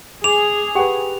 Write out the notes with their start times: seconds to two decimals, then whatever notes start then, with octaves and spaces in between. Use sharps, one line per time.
0.24 G#4 D6 F7
0.75 G4 B4 F#5 G5